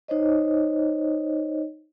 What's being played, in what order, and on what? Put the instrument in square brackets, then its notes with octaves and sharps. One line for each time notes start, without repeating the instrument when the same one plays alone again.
[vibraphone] D#4 C5 C#5 D#5